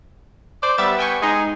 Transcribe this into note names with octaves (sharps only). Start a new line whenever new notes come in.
C5 D5
G3 B3 E5 A6
G5 G#5 C#6
G#3 D#4 G#4